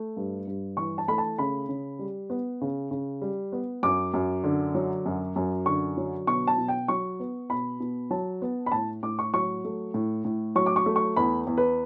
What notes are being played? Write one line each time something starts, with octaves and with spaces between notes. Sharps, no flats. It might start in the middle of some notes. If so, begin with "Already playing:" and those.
Already playing: A3
G2
G2
E3 C#6
A5
A3 B5
A5
C#3 B5
C#3
G3
B3
C#3
C#3
G3
B3
F#2 D6
F#2
D3
F#3
F#2
F#2
D3 C#6
F#3
B2 C#6
A5
B2
G5
F#3 C#6
B3
B2 B5
B2
F#3 A5
B3
B5
A2 A5
A2 D6
C#6
F#3 C#6
A3
A2
A2
F#3 C#6
D6
C#6
A3
C#6
E2 B5
E2
B4